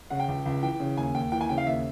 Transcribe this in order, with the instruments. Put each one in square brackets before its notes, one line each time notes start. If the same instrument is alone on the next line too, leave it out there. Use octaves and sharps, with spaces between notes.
[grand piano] C#3 F#5
G5
C#2
C#2
E3 G5
C#3
D#2 G#5
D#2 G5
E3 G5
G#5
C#3 G5
F5
D#2 E5